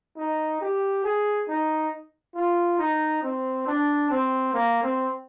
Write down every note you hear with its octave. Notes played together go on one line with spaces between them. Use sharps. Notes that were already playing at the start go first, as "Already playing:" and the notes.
D#4
G4
G#4
D#4
F4
D#4
C4
D4
C4
A#3
C4